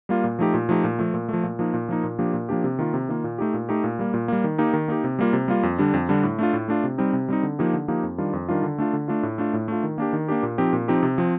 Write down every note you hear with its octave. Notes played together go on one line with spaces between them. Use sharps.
G3 A#3 F4
A#2
F3 A3 D#4 G4
A#2
F3 A3 D#4 G4
A#2
F3 A3
A#2
F3 A3
A#2
F3 A#3 D#4
A#2
F3 A#3 D#4
A#2
F3 A#3 D4 G4
A#2
F3 A#3 D4 G4
C3
D#3 A#3 F4
C3
D#3 A#3 F4
A#2
A3 D#4 G4
A#2
A3 D#4 G4
A#2
G3 A#3
A#2
G3 A#3
D#3
A#3 D#4 G4
D#3
A#3 D#4 G4
C3
G3 A#3 F4
C3
G3 A#3 F4
F2
D3 G3 D4
F2
D3 G3 D4
A2
A3 D4 F4
A2
A3 D4 F4
C3
G3 C4 D#4
C3
G3 C4 D#4
D3
F3 A#3 D#4 G4
D3
F3 A#3 D#4 G4
F2
D#3 G3 D4 F4
F2
D#3 G3 D4 F4
D3
A3 D4 F4
D3
A3 D4 F4
A2
A3 D4 F4
A2
A3 D4 F4
D#3
A#3 D4 G4
D#3
A#3 D4 G4
A#2
F3 C4 D#4 G4
A#2
F3 C4 D#4 G4
C3
F3 C4